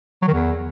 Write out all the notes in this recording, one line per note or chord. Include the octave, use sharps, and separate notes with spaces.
F#3
D#3
E2